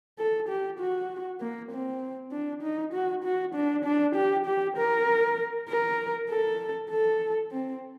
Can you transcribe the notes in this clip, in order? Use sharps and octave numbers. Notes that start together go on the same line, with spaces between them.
A4
G4
F#4
A#3
C4
D4
D#4
F#4
F#4
D4
D4
G4
G4
A#4
A#4
A4
A4
C4